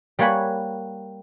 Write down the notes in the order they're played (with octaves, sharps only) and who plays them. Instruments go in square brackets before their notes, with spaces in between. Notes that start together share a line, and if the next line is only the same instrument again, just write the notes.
[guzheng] G3 A#3 C#5 F#5 G#5 B5